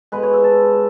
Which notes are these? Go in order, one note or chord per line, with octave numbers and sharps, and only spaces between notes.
B2 G#3 B4
C#5
E5
A5